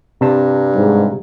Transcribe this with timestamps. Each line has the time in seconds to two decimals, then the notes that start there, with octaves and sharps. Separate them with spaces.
0.21 G2 C3 A5
0.75 G#2 G3